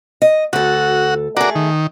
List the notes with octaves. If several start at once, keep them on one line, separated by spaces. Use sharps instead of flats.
D#5
D2 F#4 A4
A3 F#4 G#4 A#4 D5
D#3